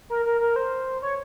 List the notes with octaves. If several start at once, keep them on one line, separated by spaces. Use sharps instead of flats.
A#4
A#4
A#4
C5
C#5